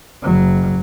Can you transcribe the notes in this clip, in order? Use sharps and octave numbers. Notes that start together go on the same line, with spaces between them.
F#1 F#3